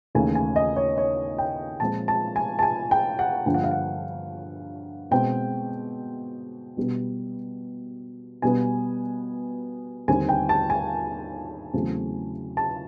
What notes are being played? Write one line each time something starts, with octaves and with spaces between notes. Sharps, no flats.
D#2 C#3 E3 A3 G#5
G#5
D#5
C#5
C#5
G5
A#2 F3 G#3 C4 A5
A5
G#5
A5
G#5
G5
F#5
G2 D3 F3 A#3 G5
F#5
F5
F#5
B2 G#3 C4 G5
B2 G3 B3
B2 G3 B3 G#5
D#2 D3 G3 C4 G#5
G5
A5
G#5
E2 C#3 F#3 A3 C4
A5